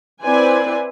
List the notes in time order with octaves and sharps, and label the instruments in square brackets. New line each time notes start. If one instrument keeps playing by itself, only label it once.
[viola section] C4 E4 B4 C5 D5 G#5